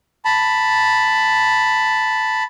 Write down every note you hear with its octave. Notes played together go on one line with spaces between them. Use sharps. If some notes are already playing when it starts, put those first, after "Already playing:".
A5 B5